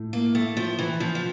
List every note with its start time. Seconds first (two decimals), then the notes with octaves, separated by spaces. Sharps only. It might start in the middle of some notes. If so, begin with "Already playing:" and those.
Already playing: A2 A3
0.13 A#3
0.35 A3
0.57 F3
0.79 E3
1.00 F3
1.15 F3